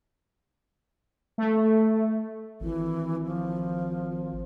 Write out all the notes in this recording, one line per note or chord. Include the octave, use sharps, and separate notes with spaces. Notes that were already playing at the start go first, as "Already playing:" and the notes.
A3
G#1 E3
F3